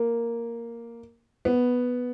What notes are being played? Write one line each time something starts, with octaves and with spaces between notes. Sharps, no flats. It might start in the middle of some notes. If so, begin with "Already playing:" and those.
Already playing: A#3
B3